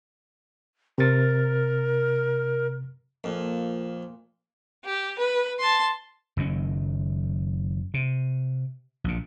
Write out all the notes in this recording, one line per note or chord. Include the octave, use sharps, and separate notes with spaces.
C3 A#4 A6
F2 A#2
G4
B4
A5 C6
F#1 F#2 D#3 C#4
C3
A#1 A#2